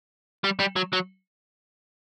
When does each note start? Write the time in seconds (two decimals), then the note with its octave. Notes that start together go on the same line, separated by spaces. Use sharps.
0.44 G3
0.60 G3
0.76 F#3
0.93 F#3